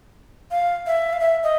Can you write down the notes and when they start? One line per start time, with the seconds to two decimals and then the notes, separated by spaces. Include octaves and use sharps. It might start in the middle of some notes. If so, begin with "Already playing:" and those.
0.51 F5
0.87 E5
1.13 F5
1.20 E5
1.44 D#5